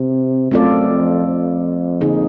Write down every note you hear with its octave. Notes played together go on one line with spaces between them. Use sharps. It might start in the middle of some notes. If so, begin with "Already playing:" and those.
Already playing: C3
F#2 A3 C4 F4 A4 D5
F2
F2
D3 F3 A#3 D#4 G#4